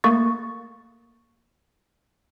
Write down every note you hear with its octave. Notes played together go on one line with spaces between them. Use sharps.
A3 A#3 C#6 A6